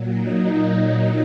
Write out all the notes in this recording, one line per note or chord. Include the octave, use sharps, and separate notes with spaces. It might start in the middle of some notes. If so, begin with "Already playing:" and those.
Already playing: A#2 F#3
D#4
D#4